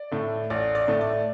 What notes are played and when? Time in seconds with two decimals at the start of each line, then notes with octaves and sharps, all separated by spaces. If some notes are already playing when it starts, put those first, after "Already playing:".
Already playing: D5
0.12 A2 A3
0.50 A1 D5
0.75 D5
0.88 A2 A3
1.01 D5